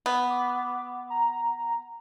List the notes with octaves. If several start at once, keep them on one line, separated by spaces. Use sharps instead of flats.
B3
D6
A#5